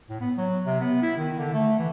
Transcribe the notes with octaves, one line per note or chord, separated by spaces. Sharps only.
A2
B3
F#3
C3
B3
E4
D#3
D3
A3
E3